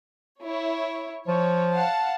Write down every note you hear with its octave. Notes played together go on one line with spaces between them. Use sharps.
E4 C#5
F3 C#5
F5 F#5 A5